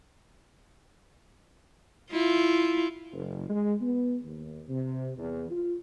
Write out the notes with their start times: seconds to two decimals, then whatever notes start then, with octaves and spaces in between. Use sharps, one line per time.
2.12 E4 F4
3.12 F#1
3.50 G#3
3.81 B3
4.23 D#2
4.69 C3
5.17 E2
5.50 F4